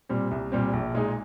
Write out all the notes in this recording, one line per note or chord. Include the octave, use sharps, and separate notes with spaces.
A#2 G3 C4
C2
A#2 G3 C4
A#1
A#2 G#3 D#4